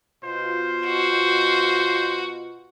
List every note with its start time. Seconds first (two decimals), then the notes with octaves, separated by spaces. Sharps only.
0.24 B2 F4 C5
0.87 F#4